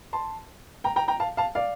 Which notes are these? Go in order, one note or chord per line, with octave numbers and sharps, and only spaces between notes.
A5 C6
G5 A#5
G5 A#5
G5 A#5
F5 A5
F5 A5
D5 F5